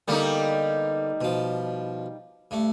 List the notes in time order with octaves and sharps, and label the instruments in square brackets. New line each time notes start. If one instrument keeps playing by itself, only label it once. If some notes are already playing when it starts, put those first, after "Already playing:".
[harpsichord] D3 A#3 B3 [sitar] G3 D#4
[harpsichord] B2 F3
G2 A3